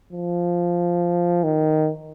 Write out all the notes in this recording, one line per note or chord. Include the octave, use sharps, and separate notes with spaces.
F3
D#3